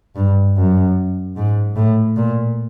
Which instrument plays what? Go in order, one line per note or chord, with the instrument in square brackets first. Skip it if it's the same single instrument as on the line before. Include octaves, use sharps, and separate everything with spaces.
[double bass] G2
F#2
G#2
A2
A#2